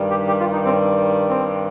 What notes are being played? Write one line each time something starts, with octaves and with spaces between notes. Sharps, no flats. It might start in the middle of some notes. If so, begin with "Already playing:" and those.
Already playing: G2 D#3 G3
G4
G4
F4
D#4
C4
C4